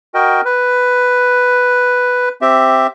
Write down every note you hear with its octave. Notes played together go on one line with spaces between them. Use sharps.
F#4 A#4 D#5 G5
B4
C4 G4 E5